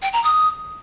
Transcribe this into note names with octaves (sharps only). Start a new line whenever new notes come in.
G5
A#5
D#6